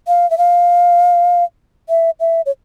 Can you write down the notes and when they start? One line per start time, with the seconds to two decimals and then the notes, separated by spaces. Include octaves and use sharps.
0.07 F5
0.30 E5
0.38 F5
1.89 E5
2.20 E5
2.46 C#5